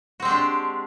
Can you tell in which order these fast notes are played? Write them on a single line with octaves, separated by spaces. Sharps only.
F#4 C4 G#3 G4 D4